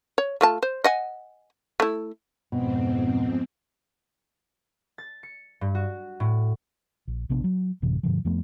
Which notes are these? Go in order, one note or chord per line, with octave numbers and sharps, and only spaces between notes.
C#5
A3 F4 A5
C5
D#5 F#5 G#5
A3 E4
F2 G#2 B2 C4
A6
C#7
G2
F#4
A2
A#1
A#1 C3 B3 D4
F#3
A1 F#2 C3 E3
G2 B2 D3 F3
F2 F3 A3 B3